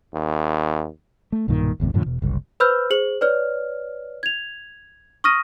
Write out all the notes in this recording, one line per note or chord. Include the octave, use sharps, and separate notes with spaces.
D#2
A3
B1 G2 A#2 D#3
G1 E2 A2 C3
F#2 A2 D3 F3
E1 B2
F#1 C2
B4 C5 B5 E6 F6 G6
G#4 C5 F#7
B4 C#5 D5 F6
G#6 F7
C#6 D#6 F6 A#6 D#7